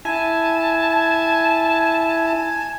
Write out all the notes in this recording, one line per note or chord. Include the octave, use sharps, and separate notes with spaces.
E4 G#5 A5